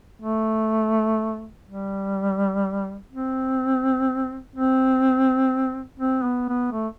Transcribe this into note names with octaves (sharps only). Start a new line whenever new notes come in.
A3
G3
C4
C4
C4
B3
B3
A3